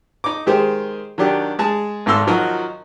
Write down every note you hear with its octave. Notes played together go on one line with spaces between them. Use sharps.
D#4 D6
D#3 G#3 G4 G#4 C5
D#3 F#3 D4 G4
G#3 G#4 A5
G#1 G#2 A4 C6 E6
D#3 F3 F#3 D#4 F#4